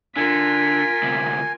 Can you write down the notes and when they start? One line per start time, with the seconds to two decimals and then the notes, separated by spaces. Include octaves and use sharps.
0.16 D3 F4 A#4 G#5 B6
1.03 D2 C3